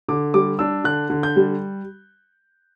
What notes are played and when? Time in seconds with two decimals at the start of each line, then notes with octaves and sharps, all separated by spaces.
0.09 D3 D6
0.34 G3 D6
0.59 D4 E6
0.84 D3 F#6
1.10 D3
1.23 G6
1.36 G3